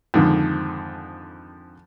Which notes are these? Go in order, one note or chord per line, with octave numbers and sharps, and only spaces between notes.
F2 G#2 D3 D#3